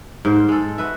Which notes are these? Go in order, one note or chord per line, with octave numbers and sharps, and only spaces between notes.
G#2 A#4 C5
G#3 A4
F#4 B4 E5